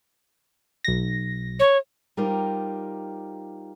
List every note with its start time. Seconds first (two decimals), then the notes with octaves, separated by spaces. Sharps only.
0.84 B1 A#6
1.59 C#5
2.17 G3 D#4 F4 G4 A#4 C5